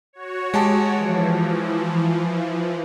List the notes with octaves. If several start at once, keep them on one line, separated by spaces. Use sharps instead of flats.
F#4 C#5
G#3 G4 A5
E3 F3